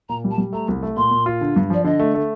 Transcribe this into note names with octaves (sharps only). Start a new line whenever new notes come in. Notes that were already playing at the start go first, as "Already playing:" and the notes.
A#2 A#5
G3
A5
G3
A3 A#5
C2
A3
A#2 C6
A#2
F4
D3
G2
F3 D5
D3 D#5
A3
A3